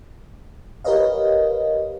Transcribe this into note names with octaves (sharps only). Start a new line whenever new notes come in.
G4 A#4 B4 C#5 D#5 F5